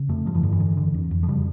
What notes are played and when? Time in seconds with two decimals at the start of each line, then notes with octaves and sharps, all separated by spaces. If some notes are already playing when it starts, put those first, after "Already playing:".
Already playing: C#3
0.09 F2 A3
0.26 G2 F3
0.35 E3
0.43 G2 D3
0.52 E3
0.60 D3
0.77 D3
0.94 F2
1.11 F2
1.23 F3
1.28 C#3 G3